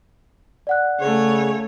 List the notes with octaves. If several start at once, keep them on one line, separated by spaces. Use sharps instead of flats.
D5 F#5 F#6
C#3 A3 C#5